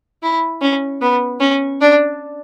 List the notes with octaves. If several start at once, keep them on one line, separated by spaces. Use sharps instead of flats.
E4
C#4
B3
C#4
D4